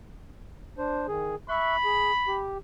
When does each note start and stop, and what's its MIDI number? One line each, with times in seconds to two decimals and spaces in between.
0.78 1.07 62
0.78 1.07 72
1.08 1.35 51
1.08 1.35 68
1.49 1.76 76
1.49 2.43 83
1.49 1.76 85
1.49 1.76 90
1.85 2.12 68
2.27 2.58 67